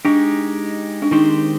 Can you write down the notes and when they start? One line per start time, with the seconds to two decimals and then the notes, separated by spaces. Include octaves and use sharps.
0.05 G#3 D4 D#4 G4
1.02 D4
1.11 D#3 G#3 C4 D#4 G4 C5